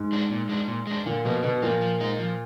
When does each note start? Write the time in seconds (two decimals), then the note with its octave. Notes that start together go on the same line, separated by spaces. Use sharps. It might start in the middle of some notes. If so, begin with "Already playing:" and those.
Already playing: G#2
0.12 G#3 D4
0.31 A#2
0.49 G#3 D4
0.68 A#2
0.87 G#3 D4
1.06 A#2 D3
1.25 B2 F3 A#3
1.43 B2 D3
1.62 A#2 F3 A#3
1.81 F3
2.00 G#3 D#4
2.19 F3